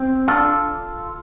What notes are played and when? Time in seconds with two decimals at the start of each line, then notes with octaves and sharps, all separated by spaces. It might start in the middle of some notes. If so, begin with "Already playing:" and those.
Already playing: C4
0.28 D4 F4 A4